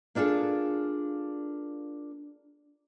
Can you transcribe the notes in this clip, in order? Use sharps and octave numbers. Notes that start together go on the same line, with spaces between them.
A#3 D4 F4 G#4 A4